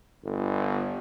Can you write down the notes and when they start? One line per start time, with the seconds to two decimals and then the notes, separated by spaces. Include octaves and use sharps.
0.24 G1